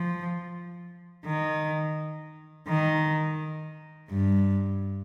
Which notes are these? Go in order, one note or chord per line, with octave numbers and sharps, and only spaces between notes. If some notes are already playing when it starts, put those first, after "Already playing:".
Already playing: F3
D#3
D#3
G2